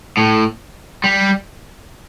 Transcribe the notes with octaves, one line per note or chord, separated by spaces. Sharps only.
A2
G3